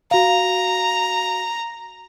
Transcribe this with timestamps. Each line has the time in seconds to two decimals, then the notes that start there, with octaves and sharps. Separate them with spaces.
0.11 F#4 F5 A#5